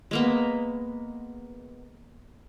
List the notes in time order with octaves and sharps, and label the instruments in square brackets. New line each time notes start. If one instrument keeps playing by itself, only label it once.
[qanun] G#3 A#3 B3